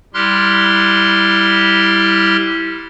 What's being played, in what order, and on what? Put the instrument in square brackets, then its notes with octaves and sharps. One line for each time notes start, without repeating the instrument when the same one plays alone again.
[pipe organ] G3 E4 G4 C6 F6 F#6